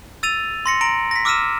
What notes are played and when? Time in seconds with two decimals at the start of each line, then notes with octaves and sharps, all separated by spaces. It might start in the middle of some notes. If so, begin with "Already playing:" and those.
0.23 E6 A6 D#7 F7
0.66 C6 A#6 C#7
0.81 A#5 A#6 D7 F#7
1.11 A#6 B6
1.25 D6 E6 F6 B6 D#7 E7